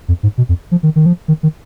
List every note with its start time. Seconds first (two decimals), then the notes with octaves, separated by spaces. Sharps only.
0.08 F2
0.23 G#2
0.38 B2
0.49 F2
0.71 F3
0.83 D#3
0.96 D#3
1.06 F3
1.28 D#3
1.43 D#3